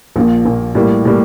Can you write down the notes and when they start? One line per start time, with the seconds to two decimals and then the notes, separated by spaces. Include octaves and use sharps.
0.16 A#1 A#2 F3 A#3
0.45 A#1 A#2 F3 A#3
0.75 A2 G3 A#3
1.05 A2 G3 A#3